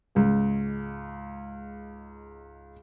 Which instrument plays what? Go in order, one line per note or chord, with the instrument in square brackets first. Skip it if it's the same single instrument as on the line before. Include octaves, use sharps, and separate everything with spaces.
[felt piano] C#2 G#2